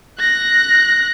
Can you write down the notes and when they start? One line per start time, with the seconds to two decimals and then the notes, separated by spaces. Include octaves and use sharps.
0.19 F#6 A#6